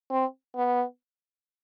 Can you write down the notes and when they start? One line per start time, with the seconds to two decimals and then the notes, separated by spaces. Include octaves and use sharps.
0.11 C4
0.56 B3